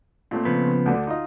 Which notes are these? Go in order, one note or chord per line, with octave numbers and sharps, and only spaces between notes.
A#2 A3 C4
C#3 F3 B3
D2 D3 D5
D#4 F4 D#5